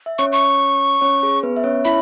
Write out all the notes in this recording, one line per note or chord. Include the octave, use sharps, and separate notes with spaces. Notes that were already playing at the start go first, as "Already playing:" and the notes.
E5
C#4 C#5 C#6
C#6
C#4 C#5
G#4
B3 B4
E5
C#4 C#5
E4 E5 B5